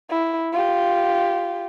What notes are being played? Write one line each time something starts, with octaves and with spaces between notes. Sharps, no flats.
E4
F4 G4